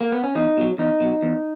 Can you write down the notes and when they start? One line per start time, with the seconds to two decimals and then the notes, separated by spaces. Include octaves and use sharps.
0.01 A#3
0.12 B3
0.24 C#4
0.35 E2 D#4
0.57 B2 F#3
0.78 E2 D#4
1.00 B2 F#3
1.22 E2